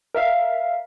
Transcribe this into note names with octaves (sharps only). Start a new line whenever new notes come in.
A#4 E5 F5